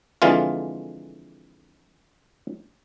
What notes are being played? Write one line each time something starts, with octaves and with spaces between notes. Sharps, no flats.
F2 D3 E3 G#3 F4